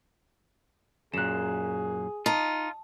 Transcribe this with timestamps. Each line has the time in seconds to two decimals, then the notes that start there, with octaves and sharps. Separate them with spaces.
1.14 F#2 A#2 G#4 F#6 E7
2.26 D#4 F4 A5